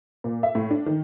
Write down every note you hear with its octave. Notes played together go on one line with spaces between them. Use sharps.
A#2
E5
A2
D4
D#3